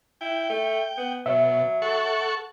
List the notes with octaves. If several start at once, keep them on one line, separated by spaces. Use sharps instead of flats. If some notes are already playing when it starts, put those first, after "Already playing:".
E4 G5
A3
B3
B2 F#3 E5
A4 F#5 C#6